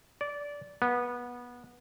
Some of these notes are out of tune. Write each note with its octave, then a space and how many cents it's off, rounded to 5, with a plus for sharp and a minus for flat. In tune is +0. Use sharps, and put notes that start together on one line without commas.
D5 -15
B3 -20